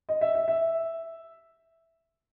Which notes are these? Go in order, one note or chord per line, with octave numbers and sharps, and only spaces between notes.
D#5
E5
E5
E5